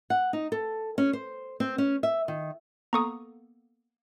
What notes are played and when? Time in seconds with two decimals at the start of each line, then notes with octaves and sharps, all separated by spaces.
0.10 F#5
0.33 D#4
0.52 A4
0.98 C#4
1.13 C5
1.60 C4
1.78 C#4
2.03 E5
2.28 D#3
2.93 A#3 B3 A4 A#5 C#6 D#6